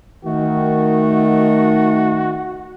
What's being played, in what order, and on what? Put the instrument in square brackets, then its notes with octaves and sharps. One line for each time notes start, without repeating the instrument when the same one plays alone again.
[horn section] D#3 [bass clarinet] A3 [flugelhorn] F#4